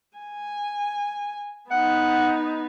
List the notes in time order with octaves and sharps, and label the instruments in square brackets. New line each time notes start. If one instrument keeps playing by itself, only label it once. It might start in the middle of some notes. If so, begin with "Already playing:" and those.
[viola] G#5
[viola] B3 D#4 [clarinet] F#5